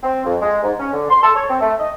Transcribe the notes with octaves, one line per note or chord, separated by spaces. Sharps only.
C4
F2
G#3
G#2
C#4
D3
C6
A4
C#5
C4
A3
D#5